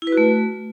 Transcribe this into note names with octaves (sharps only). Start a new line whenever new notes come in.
E4
B4
F#4
A3